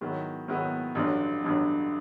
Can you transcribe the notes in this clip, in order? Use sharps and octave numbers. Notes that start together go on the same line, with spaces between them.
G#2 D#3 F#3 B3 E4
G#2 D#3 F#3 B3 E4
A1 G2 D3 F#3
A1 G2 D3 F#3